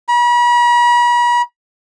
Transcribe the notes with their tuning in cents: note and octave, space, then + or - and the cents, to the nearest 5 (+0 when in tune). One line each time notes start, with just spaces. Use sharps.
B5 -45